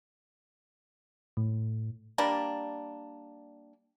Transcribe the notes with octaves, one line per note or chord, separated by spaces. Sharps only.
A2
G3 A#3 D4